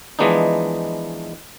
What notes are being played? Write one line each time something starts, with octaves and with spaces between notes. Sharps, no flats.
E3 F3 G#3 B3 D4 D#4